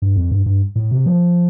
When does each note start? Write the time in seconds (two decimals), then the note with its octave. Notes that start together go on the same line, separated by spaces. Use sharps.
0.02 G2
0.16 F2
0.31 G2
0.46 G2
0.75 A2
0.91 C3
1.06 F3